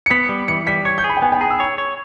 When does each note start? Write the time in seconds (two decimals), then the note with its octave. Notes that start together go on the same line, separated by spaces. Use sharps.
0.06 C#7
0.10 B3 B6
0.29 G3
0.48 E3 C#7
0.67 G3 B6
0.85 C#5 G#6
0.98 G6
1.04 G#4
1.10 B5
1.17 G5
1.22 B3 G#5
1.32 G5
1.41 G#4 A#5
1.50 E6
1.60 C#5
1.78 C#5